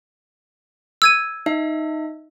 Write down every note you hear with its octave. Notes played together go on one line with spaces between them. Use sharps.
E6 G#6 D#7
D#4 E5